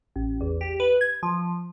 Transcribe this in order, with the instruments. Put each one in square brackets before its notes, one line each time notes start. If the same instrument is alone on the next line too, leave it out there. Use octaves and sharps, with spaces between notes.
[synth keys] A1
E2
G4
B4
G#6
F3